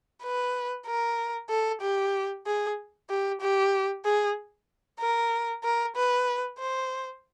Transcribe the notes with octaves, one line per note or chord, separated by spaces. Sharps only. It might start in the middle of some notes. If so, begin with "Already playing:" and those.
B4
A#4
A4
G4
G#4
G4
G4
G#4
A#4
A#4
B4
C5